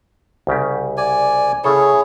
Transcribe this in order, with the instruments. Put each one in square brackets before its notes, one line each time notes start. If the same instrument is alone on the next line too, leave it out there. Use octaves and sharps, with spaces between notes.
[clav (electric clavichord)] C2 C#3 G4
[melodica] D5 G#5
[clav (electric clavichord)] C#3 A4 [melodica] E4 G#4 C#5